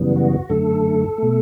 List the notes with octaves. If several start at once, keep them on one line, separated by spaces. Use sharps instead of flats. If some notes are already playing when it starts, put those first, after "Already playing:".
Already playing: F#2 C#3 E3 G3 B3
F#4
F#2 D3 A3 A4
B2 A3